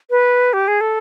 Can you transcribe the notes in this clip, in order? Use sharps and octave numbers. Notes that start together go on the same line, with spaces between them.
B4
G4
G#4
A4